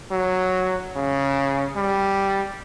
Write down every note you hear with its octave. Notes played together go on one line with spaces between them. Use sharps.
F#3
C#3
G3